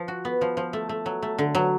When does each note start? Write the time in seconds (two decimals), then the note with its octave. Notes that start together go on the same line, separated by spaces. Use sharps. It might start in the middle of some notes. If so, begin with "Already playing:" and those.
Already playing: F3
0.08 F#4
0.25 B3
0.41 F3
0.57 F3
0.73 A3
0.89 A3
1.06 F#3
1.22 A3
1.38 D3
1.55 F#3